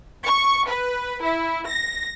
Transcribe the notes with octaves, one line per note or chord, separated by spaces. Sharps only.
C#6
B4
E4
A#6